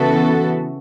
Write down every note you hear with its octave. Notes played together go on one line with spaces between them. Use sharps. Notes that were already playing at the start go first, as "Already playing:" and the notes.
Already playing: C#3 E3 B3 F#4 A4